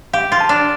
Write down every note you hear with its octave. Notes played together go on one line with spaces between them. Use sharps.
G4 F5
F4
A5
D4